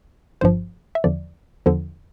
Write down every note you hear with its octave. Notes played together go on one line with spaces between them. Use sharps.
G1 G2 F3 C5
E5
E2 D3 F3 D5
E2 D3 F3